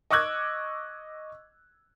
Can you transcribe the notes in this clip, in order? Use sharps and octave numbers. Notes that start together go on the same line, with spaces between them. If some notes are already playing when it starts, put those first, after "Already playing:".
D#5 C#6 D6 E6 F#6 G#6